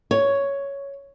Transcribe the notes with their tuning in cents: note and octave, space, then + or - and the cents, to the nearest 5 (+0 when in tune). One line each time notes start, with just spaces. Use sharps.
C#5 +5